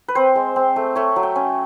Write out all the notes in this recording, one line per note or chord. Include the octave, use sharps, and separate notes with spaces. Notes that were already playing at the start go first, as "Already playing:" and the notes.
B4
C4 C5
G#3
C4
A3
A3 C#5
F#3
G5
C#4